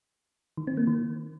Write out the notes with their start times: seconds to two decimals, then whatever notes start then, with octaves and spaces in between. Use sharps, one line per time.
0.57 D#3
0.67 C4
0.77 A#3
0.87 D#3